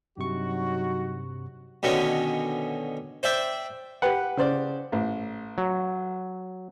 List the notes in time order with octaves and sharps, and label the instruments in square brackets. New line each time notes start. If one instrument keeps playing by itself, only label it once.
[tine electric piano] G2 C3 C#6 [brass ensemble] F#3 D#4 F#4
[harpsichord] B2 D3 D#3 C#4
C5 D5 E5 G5
[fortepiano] G4 B4 [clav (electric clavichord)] F#5
[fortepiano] C#3 C5 D5
A1
[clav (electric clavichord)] F#3